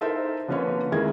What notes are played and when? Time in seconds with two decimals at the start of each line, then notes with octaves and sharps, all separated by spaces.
0.01 D#4 E4 A4 A#4 C5 E5
0.48 D3 F3 A#3 C#4 B4 C#5
0.92 F2 D#3 G#3 E4 A#4 G#6